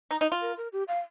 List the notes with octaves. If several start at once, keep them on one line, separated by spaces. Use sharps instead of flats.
D#4
D#4
F4
A#4
A#4
G4
F5